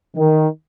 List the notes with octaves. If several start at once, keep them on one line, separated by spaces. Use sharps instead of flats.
D#3